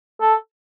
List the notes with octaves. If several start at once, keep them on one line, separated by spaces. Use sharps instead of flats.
A4